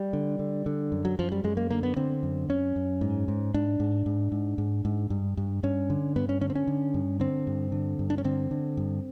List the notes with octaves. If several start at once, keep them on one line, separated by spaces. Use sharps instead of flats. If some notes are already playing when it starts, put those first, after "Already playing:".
Already playing: G3
D3
D3
D3
F#2
F#3
F#2 F3
G3
F#2 G#3
A#3
D3 A#3
B3
D3 C4
F#2
F#2 C#4
F#2
G#2
G#2
G#2 D4
G#2
G#2
G#2
G#2
G#2
G2
G2
G2 C#4
D3
G2 B3
C#4
D3 C#4
C4
C#4
D3
G2
D3 C4
G2
D3
G2
D4
C#4
D3 C4
D3
G2